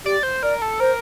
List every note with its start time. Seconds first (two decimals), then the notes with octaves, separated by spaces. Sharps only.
0.05 G4 D5
0.23 C5
0.43 A#4 D5
0.62 A4
0.80 A#4 C5